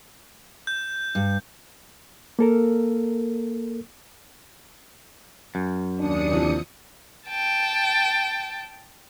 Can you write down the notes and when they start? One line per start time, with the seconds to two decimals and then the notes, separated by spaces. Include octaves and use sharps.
0.67 G6
1.15 G2
2.39 A#3 A4 A#4
5.55 F#2
5.99 D#2 D4 D#6 C#7
6.31 C3 E3 F3
7.28 G5 A5